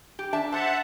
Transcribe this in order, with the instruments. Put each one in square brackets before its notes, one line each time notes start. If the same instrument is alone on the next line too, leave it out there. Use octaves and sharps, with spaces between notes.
[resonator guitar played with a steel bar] G4
D4 E5 A5
[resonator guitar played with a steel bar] C5 [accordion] E5 F#5 A5